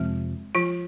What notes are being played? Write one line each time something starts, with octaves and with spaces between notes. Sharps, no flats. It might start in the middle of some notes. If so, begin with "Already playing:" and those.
Already playing: F2 C3 F3 G#3 C4
F3 F4